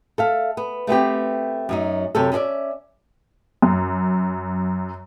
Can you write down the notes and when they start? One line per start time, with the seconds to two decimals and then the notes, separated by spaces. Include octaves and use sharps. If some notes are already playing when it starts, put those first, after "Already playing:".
0.18 A4 E5 F5
0.57 B3
0.87 A3 B3 C4 G4
1.69 F#2 F#3 D#4
2.15 F#2 C3 C#4 A4
2.32 C#4 D#4 A4 D5 E5
3.62 F#2